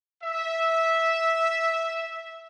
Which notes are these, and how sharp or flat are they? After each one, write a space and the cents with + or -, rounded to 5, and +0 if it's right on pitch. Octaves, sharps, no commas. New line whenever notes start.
E5 -10